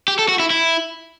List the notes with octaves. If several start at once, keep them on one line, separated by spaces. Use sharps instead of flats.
G4
A4
F#4
E4
E4